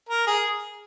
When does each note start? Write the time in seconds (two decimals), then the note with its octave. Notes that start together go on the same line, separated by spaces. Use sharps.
0.09 A#4
0.27 G#4